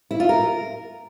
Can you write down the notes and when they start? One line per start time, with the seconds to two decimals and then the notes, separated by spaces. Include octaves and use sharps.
0.11 E4
0.20 F4
0.29 A#4